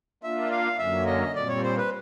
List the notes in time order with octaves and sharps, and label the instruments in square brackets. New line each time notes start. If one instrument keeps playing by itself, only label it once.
[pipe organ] A#3 D4 F4 [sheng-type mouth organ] E5
[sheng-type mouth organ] F5
[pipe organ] F#2 D3 F#3 A#3 C#4 [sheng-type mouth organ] E5
[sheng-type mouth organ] D#5
[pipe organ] A#2 G3 C4 [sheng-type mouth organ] D5
[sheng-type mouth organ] C#5
C5
B4